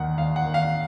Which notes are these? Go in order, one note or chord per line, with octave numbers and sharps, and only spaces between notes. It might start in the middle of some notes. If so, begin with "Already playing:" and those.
Already playing: D#2 D#3 F#5
D#2 F5
F#5
D#3
F5